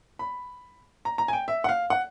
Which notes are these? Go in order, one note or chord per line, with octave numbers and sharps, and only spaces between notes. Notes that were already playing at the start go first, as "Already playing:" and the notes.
B5
A#5
A#5
G#5
G5
E5
F#5
F5
F#5